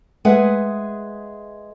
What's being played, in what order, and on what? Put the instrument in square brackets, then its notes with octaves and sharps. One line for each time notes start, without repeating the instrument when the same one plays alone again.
[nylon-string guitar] G#3 G#4 B4 E5 F#5